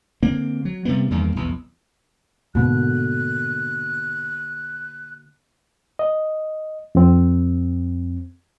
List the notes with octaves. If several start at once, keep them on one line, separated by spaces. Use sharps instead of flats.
D3 A#3 C4
F#3
C3 G3 A#3 B3
E2 G2 D#3 A#3
B1 E2
G#2 B2 D3 A#3 F#4 F#6
D#5
F2 C4